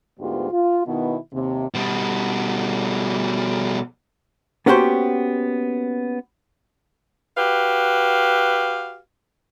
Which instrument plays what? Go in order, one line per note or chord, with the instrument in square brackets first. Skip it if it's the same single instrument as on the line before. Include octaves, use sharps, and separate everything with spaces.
[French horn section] D2 G#2 B3 F4 G4
F4
B2 D#3 B3 E4
D#2 C3
[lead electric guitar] B2 G3
[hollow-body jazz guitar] A#3 B3 C#4 F#4 G4 C5
[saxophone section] F#4 G4 B4 F5